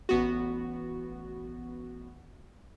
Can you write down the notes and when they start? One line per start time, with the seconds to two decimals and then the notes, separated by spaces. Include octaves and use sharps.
0.09 A1 B3 F#4